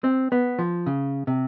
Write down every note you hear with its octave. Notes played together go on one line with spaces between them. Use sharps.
C4
B3
F3
C#3
C3